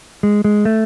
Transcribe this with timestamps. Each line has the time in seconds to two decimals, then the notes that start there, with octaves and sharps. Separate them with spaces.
0.23 G#3
0.45 G#3
0.65 A3